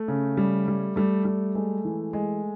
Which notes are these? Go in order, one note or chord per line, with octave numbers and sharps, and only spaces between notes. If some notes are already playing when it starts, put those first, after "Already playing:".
Already playing: A3
C#3
G3
G3
G3 A3
G3
G#3 A3
E3
G#3